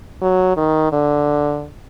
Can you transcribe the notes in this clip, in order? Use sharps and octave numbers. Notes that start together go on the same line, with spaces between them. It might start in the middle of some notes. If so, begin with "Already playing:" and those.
F#3
D#3
D3